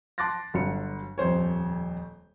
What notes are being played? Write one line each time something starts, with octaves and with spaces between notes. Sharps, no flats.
A5 C6 D6 F#6 A6 A#6
G1 F#3 C#7
D#1 F2 C5 C#5